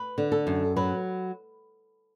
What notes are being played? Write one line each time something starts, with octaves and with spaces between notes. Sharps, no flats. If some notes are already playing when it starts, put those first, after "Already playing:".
Already playing: B4
D3
A4
F#2
F#3 B4